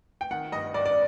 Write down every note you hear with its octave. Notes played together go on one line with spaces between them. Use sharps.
G5
D#3 F#5
G2 D#5
G2 D5
D5